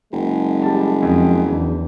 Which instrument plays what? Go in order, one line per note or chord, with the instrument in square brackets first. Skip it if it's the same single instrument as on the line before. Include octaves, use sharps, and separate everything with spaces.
[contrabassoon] F#1 [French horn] G#3
[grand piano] G3 A5
F2
[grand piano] E2 [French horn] D4